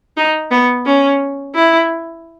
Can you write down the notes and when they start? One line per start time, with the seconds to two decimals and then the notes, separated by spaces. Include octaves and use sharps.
0.17 D#4
0.51 B3
0.86 C#4
1.55 E4